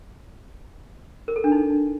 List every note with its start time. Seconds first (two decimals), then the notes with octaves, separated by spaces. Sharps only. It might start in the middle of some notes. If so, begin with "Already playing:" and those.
1.28 A#4
1.36 A4
1.44 D4
1.52 D#4